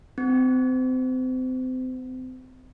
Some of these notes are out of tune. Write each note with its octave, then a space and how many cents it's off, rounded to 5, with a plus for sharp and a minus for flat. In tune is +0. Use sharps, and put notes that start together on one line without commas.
C4 -30